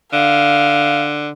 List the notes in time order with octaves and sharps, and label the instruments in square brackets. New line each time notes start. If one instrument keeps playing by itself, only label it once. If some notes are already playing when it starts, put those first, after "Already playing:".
[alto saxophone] D3 [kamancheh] F5